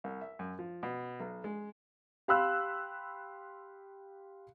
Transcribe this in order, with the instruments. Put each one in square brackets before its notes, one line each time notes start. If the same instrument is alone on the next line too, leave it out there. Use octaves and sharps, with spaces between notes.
[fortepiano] C2
E5
F#2
F3
B2
B1
G#3
[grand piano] G4 F5 B5 C6 E6 F#6